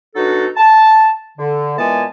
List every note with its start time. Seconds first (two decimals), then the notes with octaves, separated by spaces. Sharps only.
0.16 B2 F#3 D4 D#4 F#4 A4
0.57 A5
1.38 D3
1.77 A#2 E3 G#3 B3 G#5 A5